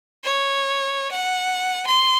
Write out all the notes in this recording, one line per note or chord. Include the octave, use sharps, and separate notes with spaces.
C#5
F#5
C6